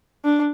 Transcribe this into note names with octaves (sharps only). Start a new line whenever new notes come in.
D4